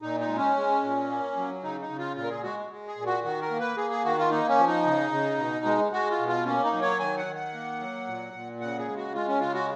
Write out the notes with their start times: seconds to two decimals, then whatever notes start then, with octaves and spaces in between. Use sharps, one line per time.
0.02 A#2 D#4
0.20 D#4
0.28 G#3
0.38 C#4
0.56 G#3
0.83 A#2
1.09 A#3
1.36 F#3
1.63 C#3 D#4
1.81 D#4
1.90 C#3
1.98 F4
2.16 A#2 F4
2.24 A#4
2.30 G#4
2.43 G#3 F#4
2.70 G#3
2.88 G#4
2.97 A#2
3.06 F#4
3.23 D#3 F#4
3.42 A#4
3.51 A#3
3.60 B4
3.77 A#3 G#4
3.91 G#4
4.05 D#3 F#4
4.18 F4
4.31 A#3 D#4
4.49 C#4
4.58 F3
4.67 D#4
4.86 C#3
5.12 C#3
5.38 B2
5.65 G#3
5.92 G#3 F#4
6.11 F4
6.19 B2
6.28 F4
6.46 A#3 C#4
6.64 D#4
6.73 F#3
6.82 C#5
6.99 D#3 G#5
7.17 F#5
7.26 D#3
7.35 F#5
7.54 A#3
7.80 F#3
8.07 A#2
8.34 A#2
8.61 C#3 F#5
8.78 G#4
8.88 G#3
8.97 F#4
9.14 G#3 F4
9.28 C#4
9.41 C#3 F4
9.54 F#4